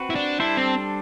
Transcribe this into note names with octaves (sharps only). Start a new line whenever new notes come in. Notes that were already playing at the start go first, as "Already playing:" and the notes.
Already playing: C4 F#4 B4
E4
D4
G3 D4 E4 A4 C5
C4